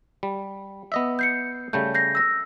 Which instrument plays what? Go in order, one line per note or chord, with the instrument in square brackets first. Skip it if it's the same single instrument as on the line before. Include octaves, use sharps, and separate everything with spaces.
[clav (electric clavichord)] G3
B3 D#5 E5
[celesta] G6 C7 C#7
[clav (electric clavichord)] C#3 G3 A3 [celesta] G6
[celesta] G6 A#6 C7
E6 A#6